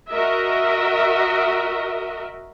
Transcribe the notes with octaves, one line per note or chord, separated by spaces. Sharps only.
F#4 A#4 D#5 E5